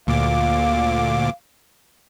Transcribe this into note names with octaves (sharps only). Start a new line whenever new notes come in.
D2 A#2 F5 D6